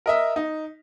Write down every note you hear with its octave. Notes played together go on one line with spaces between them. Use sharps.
A#4 D#5 E5
D#4